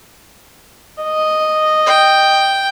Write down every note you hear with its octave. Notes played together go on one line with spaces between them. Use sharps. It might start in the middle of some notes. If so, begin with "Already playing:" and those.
D#5
G5